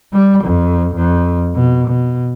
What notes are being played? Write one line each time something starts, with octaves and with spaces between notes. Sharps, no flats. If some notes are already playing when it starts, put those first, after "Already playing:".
G3
F2
F2
B2
B2